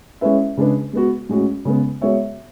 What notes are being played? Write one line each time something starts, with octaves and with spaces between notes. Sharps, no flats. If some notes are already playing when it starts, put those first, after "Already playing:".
G#3 C#4 E4 B4 E5
C#3 G#3 D4 G#4 B4
G#3 B3 F#4
A2 G#3 C#4 F#4
C#3 G#3 B3
G#3 B3 F#4 C#5 E5